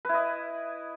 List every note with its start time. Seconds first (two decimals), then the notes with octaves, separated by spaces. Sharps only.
0.05 B4
0.09 E4
0.14 D#5